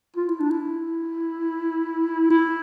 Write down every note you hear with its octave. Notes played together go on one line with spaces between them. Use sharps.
F4
E4
D4
E4
E4